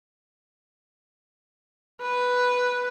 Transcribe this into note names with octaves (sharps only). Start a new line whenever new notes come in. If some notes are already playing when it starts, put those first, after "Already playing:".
B4